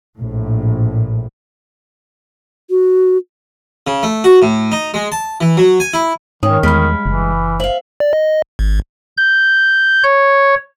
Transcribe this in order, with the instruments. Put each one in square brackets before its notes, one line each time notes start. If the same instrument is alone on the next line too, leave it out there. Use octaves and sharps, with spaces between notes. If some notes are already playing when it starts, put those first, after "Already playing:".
[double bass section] A#1 A2
[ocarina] F#4
[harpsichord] C#3
A3
F#4
A2
D#4
G#3
A5
E3
F#3
G#5
E4
[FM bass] G#2 [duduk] D#3 [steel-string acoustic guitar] C#4 [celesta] G5 D#6
[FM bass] E2 [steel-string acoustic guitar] G2 G#3 [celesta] B5 F6 B6
[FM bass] F#1 [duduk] E3
[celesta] C5 F#7 [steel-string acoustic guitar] E5 F5
[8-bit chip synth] D5
D#5
G#1
[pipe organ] G6
C#5